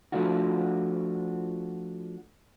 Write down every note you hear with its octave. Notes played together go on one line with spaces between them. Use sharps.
F3 A3 D4 F4 F#4